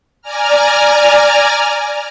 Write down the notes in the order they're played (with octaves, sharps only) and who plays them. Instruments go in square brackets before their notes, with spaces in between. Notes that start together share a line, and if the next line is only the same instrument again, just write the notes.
[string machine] D5 G#5 A#5 F6